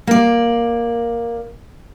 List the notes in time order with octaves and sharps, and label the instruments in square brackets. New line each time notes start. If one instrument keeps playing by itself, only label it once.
[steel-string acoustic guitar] A#3 D5